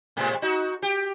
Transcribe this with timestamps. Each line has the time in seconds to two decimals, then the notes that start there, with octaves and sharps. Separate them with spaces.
0.17 A2 C3 G#3
0.42 D#4 F#4
0.82 G4